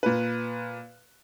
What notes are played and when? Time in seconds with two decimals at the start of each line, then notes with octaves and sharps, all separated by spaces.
0.03 A#2 B4